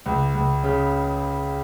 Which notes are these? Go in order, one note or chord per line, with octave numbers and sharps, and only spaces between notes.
C#2
C#2
C#3